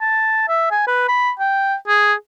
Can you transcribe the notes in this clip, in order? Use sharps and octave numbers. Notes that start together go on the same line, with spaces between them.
A5
E5
G#5
B4
B5
G5
G#4